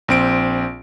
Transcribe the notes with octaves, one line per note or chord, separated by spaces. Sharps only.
A#1 C4 D7